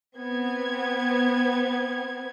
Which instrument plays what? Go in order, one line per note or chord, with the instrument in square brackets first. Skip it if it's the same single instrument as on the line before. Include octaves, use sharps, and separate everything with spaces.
[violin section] B3 C4 G#6